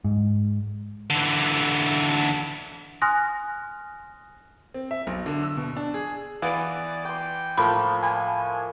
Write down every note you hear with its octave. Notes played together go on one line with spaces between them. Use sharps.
G#2
D3 E3
G#5 C6 D#6 F6 F#6 A#6
C4
E5
B1
D3
E6
B2
D4
G#4
E3 B3 D5 F5
G5 C6 D6
A2 F3 A#3 A4 B5
G#5 B5